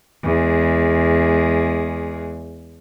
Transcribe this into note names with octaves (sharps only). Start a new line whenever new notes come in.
E2 G#3